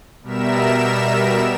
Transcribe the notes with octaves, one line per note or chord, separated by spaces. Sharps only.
B2 G3 A#4 E5 E7